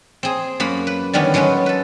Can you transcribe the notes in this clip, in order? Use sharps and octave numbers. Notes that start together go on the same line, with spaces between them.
C4 G#4
F#2 A#3 F#5 B5
B4
D3 D#3 G3 B3 C#4
F#3 G#3 B3 C#4 B4
A4 B4